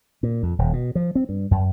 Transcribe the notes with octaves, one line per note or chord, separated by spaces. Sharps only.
A#2
F2
D#1
B2
F3
C4
G2
F#2